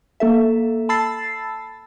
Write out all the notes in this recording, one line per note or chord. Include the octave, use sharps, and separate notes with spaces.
A#3 A4 E5
A5 B5 E6 A6 C7